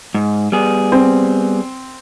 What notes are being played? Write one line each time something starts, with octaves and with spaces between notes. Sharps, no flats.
G#2
G3 B3 G#4
C4